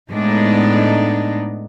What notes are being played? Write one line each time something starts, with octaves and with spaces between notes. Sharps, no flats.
A2 G#3 B3 D4 D#4